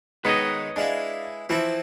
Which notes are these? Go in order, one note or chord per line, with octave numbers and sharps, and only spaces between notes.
D#3 G#3 B3 D#4 B4 C#5 D#5
G#3 D4 E4 F5
E3 F3 C4 E4